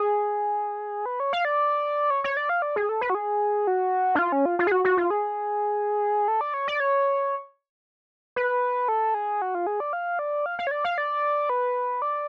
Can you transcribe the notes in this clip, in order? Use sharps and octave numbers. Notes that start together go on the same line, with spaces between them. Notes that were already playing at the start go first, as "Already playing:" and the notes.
Already playing: G#4
B4
C#5
F5
D5
C#5
C#5
D5
F5
D5
G#4
A4
B4
F#4
G#4
F#4
D4
F4
C#4
F4
F4
G#4
F#4
F#4
F4
G#4
A4
D5
C#5
D5
C#5
B4
A4
G#4
F#4
F4
G#4
D5
F5
D5
F5
F5
C#5
D5
F5
D5
B4
D5